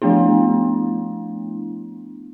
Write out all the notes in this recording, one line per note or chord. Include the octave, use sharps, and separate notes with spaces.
F3 A3 B3 D4 E4